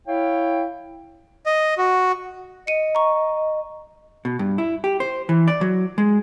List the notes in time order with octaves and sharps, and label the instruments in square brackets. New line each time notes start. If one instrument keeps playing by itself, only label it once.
[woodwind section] E4 C#5 F5 G5
[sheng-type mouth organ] D#5
F#4
[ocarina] D#5 [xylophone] C#7 D#7
[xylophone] A#5 C#6
[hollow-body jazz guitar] B2
G2
E4
G4
C5
E3
D5
F#3
G#3